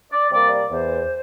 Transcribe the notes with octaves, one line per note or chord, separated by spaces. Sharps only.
D5
C3 G3 A#3 D5
D5
E2 C5